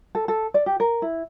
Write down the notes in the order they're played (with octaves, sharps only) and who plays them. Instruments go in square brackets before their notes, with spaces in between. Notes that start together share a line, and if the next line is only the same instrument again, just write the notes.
[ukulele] A4
A4
D5
G4
A#4
E4